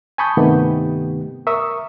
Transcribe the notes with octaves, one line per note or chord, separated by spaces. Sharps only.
G#5 A5 B5 C#6 D#6 G6
G2 C3 D#3 A3 B3 G4
A#4 E5 C#6 D#6 E6